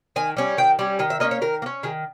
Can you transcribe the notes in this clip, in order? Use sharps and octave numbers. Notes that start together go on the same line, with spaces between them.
D#3 G#5
G3 C#4
D#3 G5
G3 C#4
D#3 D#5
E5
A#3 C#4 D#5
C#5
D#3 A#4
A#3
C#4
D#3 G#4